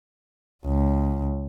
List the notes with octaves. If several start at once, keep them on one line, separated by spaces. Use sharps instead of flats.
C#2